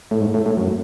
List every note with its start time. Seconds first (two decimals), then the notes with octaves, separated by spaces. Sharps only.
0.11 A2
0.21 G#2
0.34 A2
0.46 A2
0.57 F#2